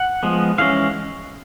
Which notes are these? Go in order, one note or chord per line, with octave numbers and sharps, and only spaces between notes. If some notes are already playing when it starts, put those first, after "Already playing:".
Already playing: F#5
F3 G#3 B3
E3 G#3 C#4 F5